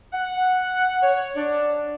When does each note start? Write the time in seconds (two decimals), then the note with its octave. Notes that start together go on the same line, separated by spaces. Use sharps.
0.13 F#5
1.02 C#5
1.36 D4